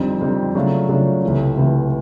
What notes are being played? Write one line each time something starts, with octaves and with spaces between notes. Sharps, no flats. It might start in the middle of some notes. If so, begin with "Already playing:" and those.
Already playing: F2 D3 G3 C4 D#4
F2 D3 G3 C4 D#4
C#3 F#3 A3 D4 F4
C#3 F#3 A3 D4 F4
C#2 C3 E3 A3
C#2 C3 E3 A3